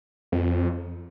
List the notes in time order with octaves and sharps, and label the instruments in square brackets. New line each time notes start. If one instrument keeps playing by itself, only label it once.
[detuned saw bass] F2